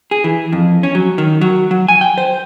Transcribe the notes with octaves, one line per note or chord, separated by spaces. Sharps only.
G#4
E3
F2
C#4
F#3
D#3
F#3
F#3
G#5
G5
C5